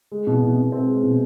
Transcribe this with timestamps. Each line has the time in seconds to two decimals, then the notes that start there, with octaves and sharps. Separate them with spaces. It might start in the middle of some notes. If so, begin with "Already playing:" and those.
0.12 G#3
0.27 B2
0.42 B2
0.57 B2
0.72 C4
0.88 G#3
1.03 B2